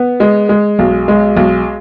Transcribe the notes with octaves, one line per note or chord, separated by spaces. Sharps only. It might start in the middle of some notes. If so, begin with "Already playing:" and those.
Already playing: B3
G#3
G#3
B1
G#3
B1